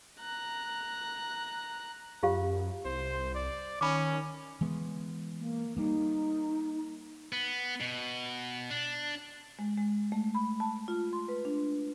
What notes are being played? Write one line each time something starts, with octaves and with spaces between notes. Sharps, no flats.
A#5 F#6
F#2 F4 G4 F5
C2 C5
D5
D#3 C#4 B5 D6
E3 G#3 B3
A#3
G3 A#3 D#4
B3
B2
D4
G#3
G#3
A3
B5
A5
F4
C6
B4
D4